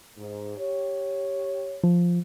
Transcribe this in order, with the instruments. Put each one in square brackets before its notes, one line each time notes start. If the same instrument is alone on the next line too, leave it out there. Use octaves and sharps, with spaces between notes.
[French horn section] G#2
G4 C#5
[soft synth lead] F3